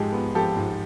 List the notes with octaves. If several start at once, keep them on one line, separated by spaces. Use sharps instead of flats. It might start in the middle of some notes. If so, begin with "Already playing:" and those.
Already playing: G#2 F3 G#3 G4 A4
B3
F3 G4 A4
G#2